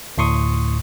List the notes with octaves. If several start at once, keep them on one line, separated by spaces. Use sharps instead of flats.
D2 A2 C6 C#6 D#6